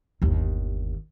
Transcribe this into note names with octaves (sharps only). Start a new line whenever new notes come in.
G1 D#2